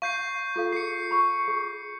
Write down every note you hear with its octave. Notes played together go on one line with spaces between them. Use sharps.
F5 C#6 G6 C7
F4 A4 F5
G#4 C7 C#7
B5 C#6
G#4